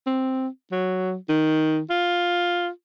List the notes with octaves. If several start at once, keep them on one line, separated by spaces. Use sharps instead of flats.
C4
F#3
D#3
F4